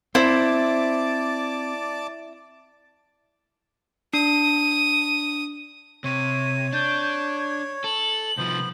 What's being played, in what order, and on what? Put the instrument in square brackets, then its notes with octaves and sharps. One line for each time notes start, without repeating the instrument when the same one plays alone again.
[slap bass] C4 [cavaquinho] E4 [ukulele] C5 [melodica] D5 A5 D6
[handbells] D4 [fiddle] D#6
[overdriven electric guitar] C3 [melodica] C#5 [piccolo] D#7
[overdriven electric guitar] D4 [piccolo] G6
[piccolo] G#6
[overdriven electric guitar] A4 [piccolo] F#7
[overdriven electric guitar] C2 F3 [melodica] B3 C5